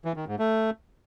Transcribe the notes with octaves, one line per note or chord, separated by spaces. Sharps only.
E3
D#3
G#2
A3